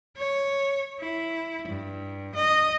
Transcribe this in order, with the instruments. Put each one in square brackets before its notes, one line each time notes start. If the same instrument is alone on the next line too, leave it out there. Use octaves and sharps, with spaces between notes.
[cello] C#5
E4
G2
D#5